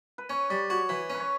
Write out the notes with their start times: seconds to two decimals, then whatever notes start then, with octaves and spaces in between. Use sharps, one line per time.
0.18 B4
0.30 C#4 C#5
0.50 G3 D5
0.70 F#4 C#5
0.89 E3 B4
1.10 C#4 B4
1.20 C#5